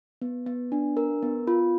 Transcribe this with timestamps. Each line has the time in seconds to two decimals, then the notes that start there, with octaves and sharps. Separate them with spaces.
0.22 B3
0.46 B3
0.72 D4
0.97 A#4
1.23 B3
1.47 F4